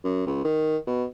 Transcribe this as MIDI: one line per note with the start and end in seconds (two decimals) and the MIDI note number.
0.04 0.24 42
0.27 0.41 37
0.44 0.77 51
0.87 1.04 47